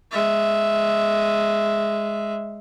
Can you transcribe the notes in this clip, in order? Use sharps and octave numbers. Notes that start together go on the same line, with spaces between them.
G#3 E5